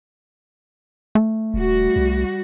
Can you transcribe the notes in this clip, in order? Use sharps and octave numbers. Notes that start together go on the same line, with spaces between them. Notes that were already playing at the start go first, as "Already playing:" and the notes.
A3
D#1 G3 F#4
C2